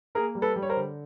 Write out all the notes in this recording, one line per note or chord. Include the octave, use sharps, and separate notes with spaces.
A#3 G#4 A#4
G3
A4 B4
G3
C#5
A#4 C5
D3